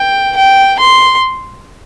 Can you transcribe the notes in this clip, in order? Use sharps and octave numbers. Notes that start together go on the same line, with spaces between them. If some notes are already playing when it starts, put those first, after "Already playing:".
Already playing: G5
G5
C6